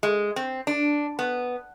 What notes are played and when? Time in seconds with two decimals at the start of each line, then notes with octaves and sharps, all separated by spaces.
0.03 G#3
0.36 C4
0.67 D4
1.19 B3